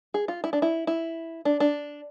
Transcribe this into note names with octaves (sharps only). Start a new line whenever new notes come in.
G#4
F4
E4
D4
E4
E4
D4
D4